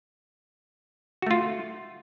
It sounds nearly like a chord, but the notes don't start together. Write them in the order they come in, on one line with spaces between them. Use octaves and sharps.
F#4 A3 F4